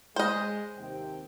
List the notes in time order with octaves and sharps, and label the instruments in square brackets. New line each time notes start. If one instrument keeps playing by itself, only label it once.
[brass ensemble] G#3 [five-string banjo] C5 D#5
[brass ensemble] D#2 C3 G5